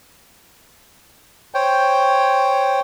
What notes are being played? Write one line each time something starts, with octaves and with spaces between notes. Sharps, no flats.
C5 C#5 G5